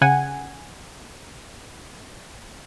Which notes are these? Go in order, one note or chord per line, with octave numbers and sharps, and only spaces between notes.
C#3 F#5 G#5